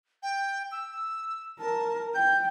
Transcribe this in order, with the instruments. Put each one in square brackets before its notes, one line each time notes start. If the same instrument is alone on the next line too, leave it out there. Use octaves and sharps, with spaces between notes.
[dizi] G5
E6
[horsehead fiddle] A#4 [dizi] A5
[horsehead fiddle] G5 [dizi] G6